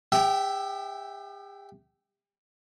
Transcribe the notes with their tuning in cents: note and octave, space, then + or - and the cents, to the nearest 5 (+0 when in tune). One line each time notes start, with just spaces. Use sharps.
G4 +45 E5 +0 G5 -25